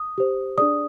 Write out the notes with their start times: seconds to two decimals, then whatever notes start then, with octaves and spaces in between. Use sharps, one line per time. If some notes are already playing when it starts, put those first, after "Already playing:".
Already playing: D#6
0.18 G4 C5
0.58 D4 G#4 D5 D#6